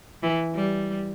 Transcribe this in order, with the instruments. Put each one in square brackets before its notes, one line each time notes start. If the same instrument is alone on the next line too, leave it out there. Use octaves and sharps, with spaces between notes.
[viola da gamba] E3
G3